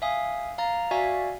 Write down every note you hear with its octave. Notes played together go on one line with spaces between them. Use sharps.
E5 F5 G#5 D#6
F5 A#5 A6
F#4 D5 E5 F5 G#5